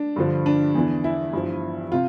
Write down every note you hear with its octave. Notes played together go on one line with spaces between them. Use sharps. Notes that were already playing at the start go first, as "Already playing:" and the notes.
Already playing: D4
G2 D3 F3
D4
E2 E3
E4
G2 F3
C3 F4